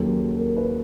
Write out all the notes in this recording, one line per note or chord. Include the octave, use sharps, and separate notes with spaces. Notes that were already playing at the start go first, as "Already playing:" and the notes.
Already playing: D#2 C#3 F#3 A4
A#4
B4